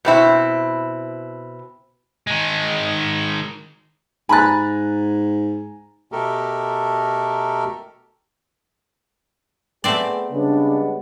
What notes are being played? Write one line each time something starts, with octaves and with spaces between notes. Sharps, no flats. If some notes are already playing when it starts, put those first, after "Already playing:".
B2 C4 E4
D#3 G#3
G#2 G#5 A#5 B5 F#6 A6
B2 A3 G4 A4 A#4
A3 B3 C4 G#4 D5
C#3 G3 G#3 B3 D4